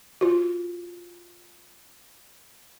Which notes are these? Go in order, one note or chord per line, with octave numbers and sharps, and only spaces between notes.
F4 F#4